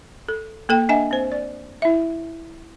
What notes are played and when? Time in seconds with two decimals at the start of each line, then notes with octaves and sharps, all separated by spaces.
0.29 A4
0.69 A#3 A4 G5
0.89 D4 D#5 E5 F#5 G#5
1.11 C4 C5
1.32 D5
1.82 E4 E5